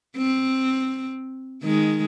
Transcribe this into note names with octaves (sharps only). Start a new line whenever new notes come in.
C4
D#3 G#3